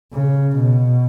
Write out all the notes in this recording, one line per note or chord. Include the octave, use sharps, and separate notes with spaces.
C#3
B2